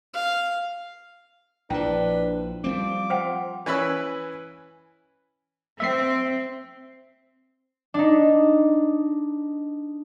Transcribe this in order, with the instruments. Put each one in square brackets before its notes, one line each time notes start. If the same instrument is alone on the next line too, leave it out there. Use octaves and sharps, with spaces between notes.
[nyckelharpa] F5
[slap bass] A#1 F3 [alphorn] D4 [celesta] E4 G5 [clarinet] B4
[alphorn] F3 [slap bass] G3 A3 C4 [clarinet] D6
[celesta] C5 F#5 G5
[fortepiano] E3 C#4 B4 B5 E6
[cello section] C4 [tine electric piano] E5 C7
[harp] D4 D#4